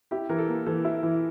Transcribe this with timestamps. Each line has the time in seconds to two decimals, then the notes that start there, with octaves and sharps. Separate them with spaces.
0.11 E4 G4
0.29 E3 A#4
0.38 A4
0.48 A#3
0.66 E3 A4
0.85 E4
1.03 E3